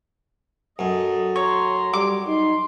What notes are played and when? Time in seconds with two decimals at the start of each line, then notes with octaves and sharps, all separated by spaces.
0.79 F#2 A4 D#5
1.36 C#5 A#5 C6
1.93 G3 D6
2.27 D#4 C6